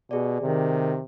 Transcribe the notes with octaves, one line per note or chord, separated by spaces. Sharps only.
B2 G4 G#4 D5
C3 D#3